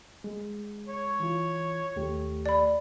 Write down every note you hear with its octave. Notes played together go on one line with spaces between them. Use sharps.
G#3
C#5
E3 F4
D#2 A3 G4
D5 B5